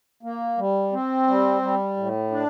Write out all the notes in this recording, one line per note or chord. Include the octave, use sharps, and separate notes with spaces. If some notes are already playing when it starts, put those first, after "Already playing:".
A#3
G3
C4
G3
G3
A2
D4